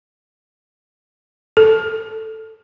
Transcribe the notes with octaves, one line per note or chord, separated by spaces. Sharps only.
A4